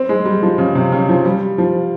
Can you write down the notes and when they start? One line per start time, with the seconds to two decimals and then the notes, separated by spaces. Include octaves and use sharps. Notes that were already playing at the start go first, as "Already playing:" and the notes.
Already playing: C4
0.09 G#3
0.25 G3
0.42 F3
0.58 C#3
0.75 C3
0.92 C#3
1.09 F3
1.25 G3
1.58 F3